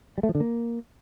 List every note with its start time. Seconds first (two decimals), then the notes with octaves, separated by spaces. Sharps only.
0.18 G3
0.23 A3
0.29 F3
0.35 D3
0.40 A#3